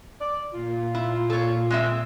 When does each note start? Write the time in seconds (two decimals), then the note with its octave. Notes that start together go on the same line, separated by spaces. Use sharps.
0.21 D5
0.54 A#2 F4
0.95 E4
1.30 A4 C#5
1.70 G#3 C4 E5